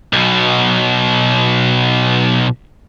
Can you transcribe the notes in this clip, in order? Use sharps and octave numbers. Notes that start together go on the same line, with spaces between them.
B1 B2